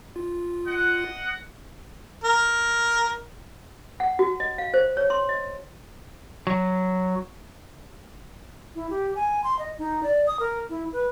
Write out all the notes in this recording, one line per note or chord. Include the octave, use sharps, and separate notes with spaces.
F4
D#5 F#5
A#4
F#5
F#4
D#5
F5
C5
C#5
C6
D#5
F#3
E4
G4
G#5
C6
D#5
D#4
D5
D#6
A#4
E4
B4